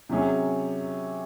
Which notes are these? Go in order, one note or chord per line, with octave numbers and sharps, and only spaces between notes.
C3 F#3 C#4 G#4